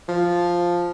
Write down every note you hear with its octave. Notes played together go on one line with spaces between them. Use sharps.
F3